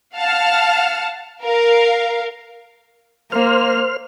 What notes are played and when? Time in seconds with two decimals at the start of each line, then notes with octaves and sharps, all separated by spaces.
0.17 F5 F#5 A5 F6
1.43 A#4 F5
3.32 A#3 C5 F6